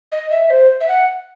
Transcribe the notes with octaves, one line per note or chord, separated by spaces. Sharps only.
D#5
E5
C5
E5
F#5